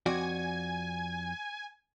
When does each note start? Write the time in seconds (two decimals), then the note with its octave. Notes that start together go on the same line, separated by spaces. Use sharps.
0.06 F2 F#4 D5 G#5